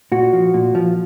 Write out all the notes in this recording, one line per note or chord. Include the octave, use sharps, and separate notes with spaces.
A#2 F#4
F3
A#2
F3